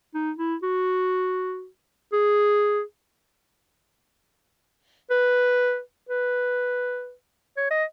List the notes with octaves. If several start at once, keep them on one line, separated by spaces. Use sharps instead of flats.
D#4
E4
F#4
G#4
B4
B4
C#5
D#5